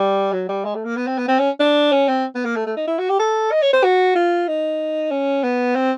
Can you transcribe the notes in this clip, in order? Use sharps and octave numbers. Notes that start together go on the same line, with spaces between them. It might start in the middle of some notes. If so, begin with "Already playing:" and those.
Already playing: G3
F#3
G3
G#3
A3
A#3
B3
C4
B3
C4
C#4
D4
C#4
C4
B3
A#3
A3
A3
D#4
E4
F#4
G4
A4
D#5
C#5
C5
F#4
F4
D#4
C#4
B3
C4